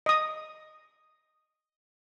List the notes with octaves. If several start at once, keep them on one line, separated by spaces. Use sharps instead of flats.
D#5 D#6